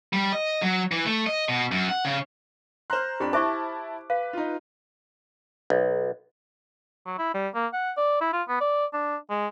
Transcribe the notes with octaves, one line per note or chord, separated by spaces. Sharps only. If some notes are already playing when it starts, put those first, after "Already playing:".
G3
D#5
F#3
E3
A3
D#5
B2
F#2
F#5
C#3
C5 A#5 C6 F6 F#6
F2 D4 G4 G5 B5
E4 C5 E5 A5 C#6 D6
B4 F5
D#4 F4
B1
F#3
E4
G3
A#3
F#5
D5
E4
F4
B3
D5
D4
G#3